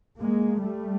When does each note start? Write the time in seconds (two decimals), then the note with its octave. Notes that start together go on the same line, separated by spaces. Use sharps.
0.20 G#3 A#3
0.61 G3 A3